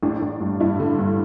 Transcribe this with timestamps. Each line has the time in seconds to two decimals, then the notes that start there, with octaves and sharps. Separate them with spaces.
0.03 A1 D4
0.22 A1
0.40 G2
0.60 G2 E4
0.80 D3
0.99 G2